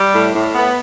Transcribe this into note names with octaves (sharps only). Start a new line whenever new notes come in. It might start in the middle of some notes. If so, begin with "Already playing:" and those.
Already playing: G3
A2
A2
B3